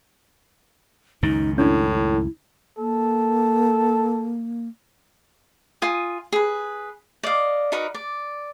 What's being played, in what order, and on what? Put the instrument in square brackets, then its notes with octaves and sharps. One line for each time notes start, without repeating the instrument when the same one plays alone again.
[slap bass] C#2 F#2 D#3 [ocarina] D#4
[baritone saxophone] A2 [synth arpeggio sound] C#4 D4 [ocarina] E4
[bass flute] A#3 [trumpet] A4
[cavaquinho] F4 G#5 D#6
G#4 B4
D5 D#5 F5
D#4 F#4 A#4 B4
D5